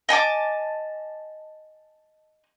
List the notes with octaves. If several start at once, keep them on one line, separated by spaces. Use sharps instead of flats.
D#5 G#5 A5 D6